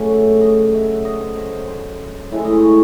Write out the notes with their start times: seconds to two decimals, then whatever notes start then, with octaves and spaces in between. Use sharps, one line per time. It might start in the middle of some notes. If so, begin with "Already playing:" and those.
Already playing: C#3 F#3 A3
0.10 E5
0.41 D#5
0.73 E5
1.05 D#5
1.21 C5
1.36 C5
1.52 C5
1.68 C5
2.32 A2 E3 G#3 E5
2.45 D#5
2.57 C#5